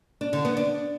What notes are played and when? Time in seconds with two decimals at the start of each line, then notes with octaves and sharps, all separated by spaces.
0.21 D4
0.33 D3
0.45 B3
0.57 D4